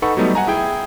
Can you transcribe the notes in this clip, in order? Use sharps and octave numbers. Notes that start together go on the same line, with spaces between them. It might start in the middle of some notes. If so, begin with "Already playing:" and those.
D#4 A4 B4 F#5 B5 C#6
F#3 G3 A3 B3 D#4
F#5 G#5 A#5
E4 G#4 G5